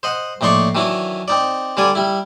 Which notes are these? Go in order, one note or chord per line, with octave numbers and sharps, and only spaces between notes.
C5 D#5 F#5
A#1 A2 D#4 D5 C6 C#6
D#3 E3 F#3 D4 E4
C4 D#4 D5
D3 G3 D5 G#5
G3 E4